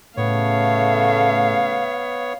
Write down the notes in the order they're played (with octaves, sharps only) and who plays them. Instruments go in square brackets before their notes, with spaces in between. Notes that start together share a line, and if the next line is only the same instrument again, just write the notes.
[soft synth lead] A2 [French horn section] C#3 A3 [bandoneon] B3 C#5 [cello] F5